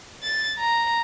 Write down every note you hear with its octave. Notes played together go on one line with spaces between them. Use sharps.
A6
A#5